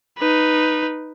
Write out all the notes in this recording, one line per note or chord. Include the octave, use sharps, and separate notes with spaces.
D#4 B4